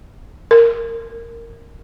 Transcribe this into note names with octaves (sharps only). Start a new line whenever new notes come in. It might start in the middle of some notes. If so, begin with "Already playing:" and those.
A#4